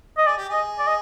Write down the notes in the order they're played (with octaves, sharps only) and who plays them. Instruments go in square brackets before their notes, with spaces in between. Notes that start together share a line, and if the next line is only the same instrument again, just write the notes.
[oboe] D#5
[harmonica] G#4 [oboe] D5
[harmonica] G4
[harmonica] G#4 [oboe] D#5
[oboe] D5
D#5